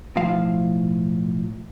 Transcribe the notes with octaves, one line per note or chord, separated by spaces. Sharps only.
B1 A2 F3 F5